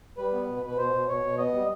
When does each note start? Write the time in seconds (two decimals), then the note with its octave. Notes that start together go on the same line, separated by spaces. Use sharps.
0.18 G3 B4
0.33 B3
0.48 B2
0.63 B2 B4
0.77 B2 C5
0.93 B2
1.08 B2 C#5
1.23 B2
1.38 B3 D#5
1.53 G3